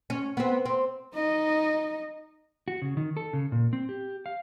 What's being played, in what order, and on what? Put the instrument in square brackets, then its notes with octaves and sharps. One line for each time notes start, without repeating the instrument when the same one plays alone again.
[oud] C#4
B3 C4
C4
[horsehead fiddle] D#4 D#5
[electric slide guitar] F#4
C#3
D#3
A4
C#3
A#2
C4
G4
F5